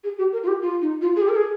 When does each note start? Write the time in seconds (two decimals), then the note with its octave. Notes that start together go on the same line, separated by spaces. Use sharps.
0.03 G#4
0.18 G4
0.32 A#4
0.43 F4
0.47 G4
0.62 F4
0.81 D#4
1.01 F4
1.16 G#4
1.21 G4
1.28 A#4
1.35 G#4